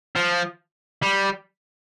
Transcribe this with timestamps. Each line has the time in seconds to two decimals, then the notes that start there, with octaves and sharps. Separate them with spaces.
0.16 F3
1.03 G3